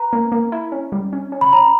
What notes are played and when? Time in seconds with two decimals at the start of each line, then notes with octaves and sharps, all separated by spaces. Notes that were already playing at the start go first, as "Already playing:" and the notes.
Already playing: B4 A#5
0.13 A#3
0.32 A#3
0.52 E4
0.72 C#4
0.92 G3
1.13 C#4
1.32 C#4
1.41 B5
1.53 C#4 A#5